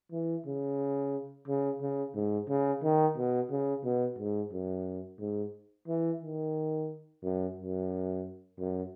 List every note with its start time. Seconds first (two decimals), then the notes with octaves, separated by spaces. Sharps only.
0.12 E3
0.46 C#3
1.48 C#3
1.81 C#3
2.15 G#2
2.49 C#3
2.83 D#3
3.17 B2
3.51 C#3
3.85 B2
4.18 G#2
4.53 F#2
5.20 G#2
5.88 E3
6.22 D#3
7.24 F#2
7.57 F#2
8.59 F#2